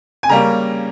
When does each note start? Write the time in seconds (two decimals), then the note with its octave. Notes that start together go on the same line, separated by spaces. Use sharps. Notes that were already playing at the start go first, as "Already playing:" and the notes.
0.23 G#5
0.29 C#3 G3 A#3 C#4 A#5